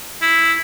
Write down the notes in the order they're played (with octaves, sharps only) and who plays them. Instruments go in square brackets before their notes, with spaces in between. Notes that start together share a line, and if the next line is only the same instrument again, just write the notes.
[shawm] E4